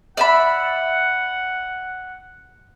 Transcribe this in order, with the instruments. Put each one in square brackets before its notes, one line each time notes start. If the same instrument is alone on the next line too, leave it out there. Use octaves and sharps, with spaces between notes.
[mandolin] D5 E5 B5 [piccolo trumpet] F#5